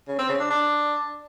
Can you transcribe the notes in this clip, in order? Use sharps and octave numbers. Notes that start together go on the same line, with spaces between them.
C#3
C4
C#3
D4
D4